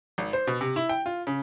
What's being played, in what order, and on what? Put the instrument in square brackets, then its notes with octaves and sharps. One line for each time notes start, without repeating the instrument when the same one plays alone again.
[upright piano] G#1
C5
B2
C3
E4
G5
F4
C#3